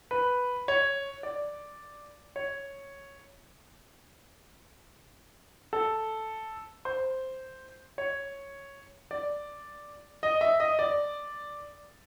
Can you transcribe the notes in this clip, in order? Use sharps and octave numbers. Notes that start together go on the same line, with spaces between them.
B4
C#5
D5
C#5
A4
C5
C#5
D5
D#5
E5
D#5
D5